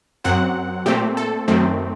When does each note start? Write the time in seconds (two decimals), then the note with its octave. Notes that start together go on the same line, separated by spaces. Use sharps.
0.24 F#2 F#3 C4 F#5
0.86 A#2 A3 C4 G4
1.17 A4
1.48 F#2 D#3 A3 C4